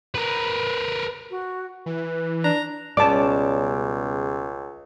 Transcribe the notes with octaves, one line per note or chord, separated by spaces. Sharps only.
A#4 B4
F#4
E3 B4
D4 A#5
C#2 B2 G3 C#4 G#4 D5 A5 D6